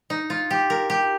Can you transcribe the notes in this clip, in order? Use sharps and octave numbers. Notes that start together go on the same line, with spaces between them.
D#4
F4
G4
A#4
G4